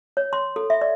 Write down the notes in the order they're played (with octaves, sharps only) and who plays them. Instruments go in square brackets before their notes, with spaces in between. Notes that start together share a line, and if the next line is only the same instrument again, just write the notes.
[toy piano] C#5
C6
A4
E5
D5